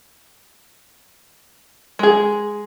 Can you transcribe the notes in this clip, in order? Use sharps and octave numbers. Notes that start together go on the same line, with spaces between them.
G#3 G#4